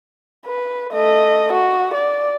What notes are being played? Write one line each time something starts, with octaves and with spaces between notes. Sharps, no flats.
B4
A3 D#5
F#4
D5